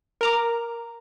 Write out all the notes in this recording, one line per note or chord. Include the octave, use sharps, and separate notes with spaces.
A#4 A#5 D6